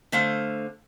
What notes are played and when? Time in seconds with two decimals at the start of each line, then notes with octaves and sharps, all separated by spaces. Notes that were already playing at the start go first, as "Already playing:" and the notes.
0.12 D3 A3 C5 F5